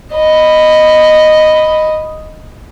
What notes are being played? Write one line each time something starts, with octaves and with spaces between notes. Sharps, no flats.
D#5 B5